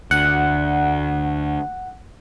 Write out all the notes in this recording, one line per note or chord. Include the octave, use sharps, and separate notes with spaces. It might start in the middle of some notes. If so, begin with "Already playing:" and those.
D2 F#5